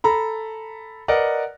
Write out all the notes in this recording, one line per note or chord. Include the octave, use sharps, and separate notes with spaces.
A4 A#5 B5
A#4 B4 D5 D#5 F#5